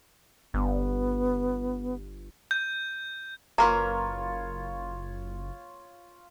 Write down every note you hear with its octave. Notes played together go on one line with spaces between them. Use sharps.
G1 B3
G6
F#1 A#3 F4 A#4 B4 C#5 A#5